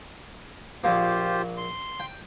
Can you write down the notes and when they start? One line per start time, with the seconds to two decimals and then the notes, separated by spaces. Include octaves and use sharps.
0.84 A#1 A#3 F4 G4 C5
1.57 C6
2.00 G5